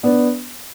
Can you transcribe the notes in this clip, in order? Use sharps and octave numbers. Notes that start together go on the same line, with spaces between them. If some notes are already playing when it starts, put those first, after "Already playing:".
B3 D4